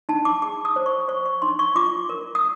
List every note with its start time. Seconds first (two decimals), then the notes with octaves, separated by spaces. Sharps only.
0.09 D#4 A5
0.25 D6
0.42 G#4 D6
0.65 D#6
0.76 C5
0.86 C#6
1.08 C5 C#6
1.25 C#6
1.42 D#4 C6
1.59 C#6
1.75 F4 D6
2.09 A#4
2.35 D#6